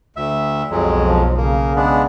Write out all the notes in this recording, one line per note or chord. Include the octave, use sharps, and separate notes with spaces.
D2 E5
B1 F2 F#3 G#3
F3
C#3 A#3
G#3 B3 D4